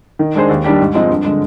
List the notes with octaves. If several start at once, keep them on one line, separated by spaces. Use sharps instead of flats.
D#3
G#3 D4 G#4 C5
D#2
D#3 G3 D4 G4
G#2
F3 G#3 C4 D#4
G2
D3 G#3